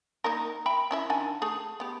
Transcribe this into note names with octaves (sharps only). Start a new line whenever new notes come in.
A#3 D#4 A#4
E5 G5 B5
C#4 E4 E5
D#3 D4 G#5
A3 G#4
B3 G4